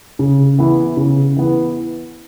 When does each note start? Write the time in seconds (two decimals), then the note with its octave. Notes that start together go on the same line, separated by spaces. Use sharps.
0.19 C#3
0.59 E3 B3 E4
0.97 C#3
1.37 E3 B3 E4